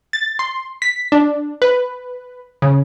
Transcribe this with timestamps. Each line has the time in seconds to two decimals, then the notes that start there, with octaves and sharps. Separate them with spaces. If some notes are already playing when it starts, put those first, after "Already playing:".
0.13 A6
0.39 C6
0.82 B6
1.12 D4
1.62 B4
2.62 C#3